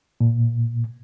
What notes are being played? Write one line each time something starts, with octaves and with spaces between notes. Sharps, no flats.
A#2